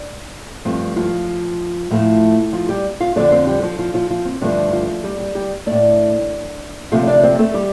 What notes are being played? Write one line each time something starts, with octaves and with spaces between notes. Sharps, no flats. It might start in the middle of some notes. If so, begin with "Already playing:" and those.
Already playing: D4
G2 F3 A3 C4
F3 F4
A2 F3 A3
F3 F4
G3 G4
F4 F5
F2 D3 F3 A3 D4 D5
C4 C5
G3 G4
F3 F4
F3 F4
F3 F4
F3 F4
C4
G2 D3 F3 A3 D4
F3 F4
G3 G4
G3 G4
G3 G4
A2 A3 D4 D5
D2 C3 F3 A3 F4 F5
D4 D5
C4 C5
A3 A4
G3 G4